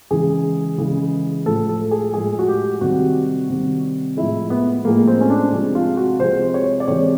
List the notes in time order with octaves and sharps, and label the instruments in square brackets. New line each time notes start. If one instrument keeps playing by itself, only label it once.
[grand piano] C#3 E3 G#3 G#4
C#3 E3 G#3
A2 F3 G#3 A4
A4
G#4
A2 F3 G#3 G#4
F#4
G4
C3 D#3 G3 F#4
C3 D#3 G3
A2 F3 G#3 E4
B3
A2 F3 G#3 A#3
C4
C#4
D4
C3 F3 G#3
F4
F#4
C3 F3 G#3 C5
C#5
D5
C3 E3 G#3 C#5